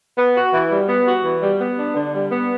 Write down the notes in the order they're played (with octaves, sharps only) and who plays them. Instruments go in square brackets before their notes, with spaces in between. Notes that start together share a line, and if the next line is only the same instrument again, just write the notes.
[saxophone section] B3
F#4
E3
G3
B3
F#4
E3
G3
B3
D4
D3
G3
B3